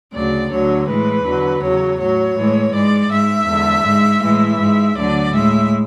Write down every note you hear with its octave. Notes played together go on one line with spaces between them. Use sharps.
D2 C#3 F#3 D5
D2 D3 F#3 C#5
A2 E3 G#3 B4
E2 D3 F#3
E2 C#3 F#3 C#5
A2 F#3 C#5
A2 E3 G#3
G#2 G#3 D5
G#2 G#3 E5
E2 D3 G#3
G#2 G#3
A2 E3 G#3 E5
G#2 G#3
D2 D3 F#3 D5
A2 G#3 E5